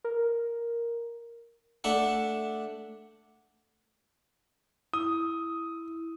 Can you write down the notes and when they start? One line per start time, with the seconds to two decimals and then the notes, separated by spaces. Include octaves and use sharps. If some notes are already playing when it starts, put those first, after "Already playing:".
0.04 A#4
1.84 A3 D4 E5 F#5
4.94 E4 D#6